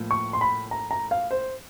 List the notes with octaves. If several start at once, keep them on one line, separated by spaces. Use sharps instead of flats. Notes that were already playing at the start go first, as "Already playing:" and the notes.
Already playing: A2 F3 A#3
C#6
C6
B5
A#5
A#5
F5
C5